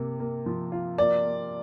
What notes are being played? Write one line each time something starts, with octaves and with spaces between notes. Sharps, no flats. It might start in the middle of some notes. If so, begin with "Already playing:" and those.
Already playing: C3 A#3
A#3
F3
F4
A#3 D5
A#3